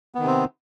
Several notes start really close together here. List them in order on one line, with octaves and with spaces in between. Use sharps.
B3 D#3 C3 C4